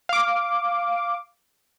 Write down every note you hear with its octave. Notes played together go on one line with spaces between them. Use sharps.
F5 D6